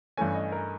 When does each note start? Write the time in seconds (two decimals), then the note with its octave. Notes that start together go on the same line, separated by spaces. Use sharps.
0.17 G2 E3 A3 C#4 G#5
0.34 D#5
0.52 A#4